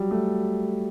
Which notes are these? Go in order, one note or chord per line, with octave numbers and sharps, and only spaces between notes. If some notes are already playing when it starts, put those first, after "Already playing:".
Already playing: F#3 G3
A3